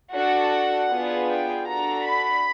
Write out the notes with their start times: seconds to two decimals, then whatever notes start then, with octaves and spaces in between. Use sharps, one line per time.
0.13 D4 F#4 A4 F#5
0.90 B3 D4 F4 G#4
1.28 G5
1.67 D4 F#4 A4 A#5
2.04 B5